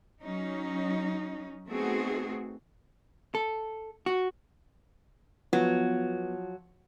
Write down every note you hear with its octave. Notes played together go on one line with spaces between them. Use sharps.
F#3 C#4 D#4
A3 B3 C4 D#4 F#4 G#4
A4
F#4
F3 F#3 B3